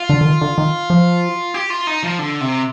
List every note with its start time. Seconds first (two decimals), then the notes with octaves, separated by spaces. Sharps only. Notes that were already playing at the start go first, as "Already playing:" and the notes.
Already playing: F4
0.09 D3
0.21 D3
0.26 D#3
0.41 D3
0.58 D#3
0.90 F3
1.54 G4
1.70 F4
1.87 D#4
2.03 F3
2.19 D3
2.41 C3